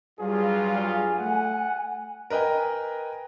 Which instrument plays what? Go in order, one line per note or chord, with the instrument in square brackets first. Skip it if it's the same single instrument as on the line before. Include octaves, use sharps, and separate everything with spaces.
[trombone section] G2 F#3 F4 [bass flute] G3 [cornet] G#4
[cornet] G#4 [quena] G#5
[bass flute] A3 [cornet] F#5
[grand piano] A#4 B4 D#5 G5 G#5